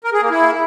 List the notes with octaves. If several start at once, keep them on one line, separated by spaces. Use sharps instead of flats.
A#4
G#4
A#3
E4